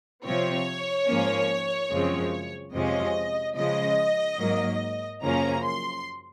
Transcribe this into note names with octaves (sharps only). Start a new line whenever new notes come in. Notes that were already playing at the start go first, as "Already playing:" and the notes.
C3 F3 C4 C#5
G#2 F3 A#3 C#4
F#2 C#3 F3 G#3 C4
F2 C3 F3 G#3 C#4 D#5
C#3 F3 G#3 D#5
G#2 F#3 A#3
F#2 C#3 F3 A#3 C#4 A#5
C6